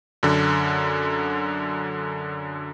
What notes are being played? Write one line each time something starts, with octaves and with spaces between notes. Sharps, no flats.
F#2 D3